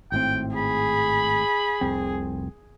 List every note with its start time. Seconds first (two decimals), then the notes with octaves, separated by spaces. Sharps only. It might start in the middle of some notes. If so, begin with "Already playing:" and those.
0.12 G#1 A2 C4 G5
0.56 G#4 B5
1.81 F1 C2 C4